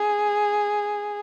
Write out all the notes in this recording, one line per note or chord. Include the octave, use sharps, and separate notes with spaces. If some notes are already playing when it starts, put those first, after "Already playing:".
Already playing: G#4